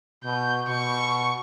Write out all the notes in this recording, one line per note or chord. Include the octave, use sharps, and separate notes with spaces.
B2 G6
B2 C#6